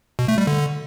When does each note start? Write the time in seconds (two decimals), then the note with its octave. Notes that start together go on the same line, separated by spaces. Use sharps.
0.19 B2
0.28 A3
0.38 G3
0.47 D3